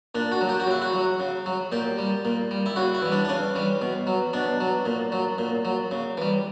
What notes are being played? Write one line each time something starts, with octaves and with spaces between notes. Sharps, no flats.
A#2 D4
F#4
F#3
G4
F#4
C#3 E4
F#4
F#3
C#3
F#3
A#2 G4
G3
A#2
G3
E4
C#3 F#4
E4
E3 G3
D4
D4
C#3 C#4
E3 G3
B2
F#3
B2 D4
F#3
A#2
F#3
A#2
F#3
C#3
E3 G3